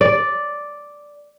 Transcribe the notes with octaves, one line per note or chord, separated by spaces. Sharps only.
D5